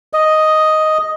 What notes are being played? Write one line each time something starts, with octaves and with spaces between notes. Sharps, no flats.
D#5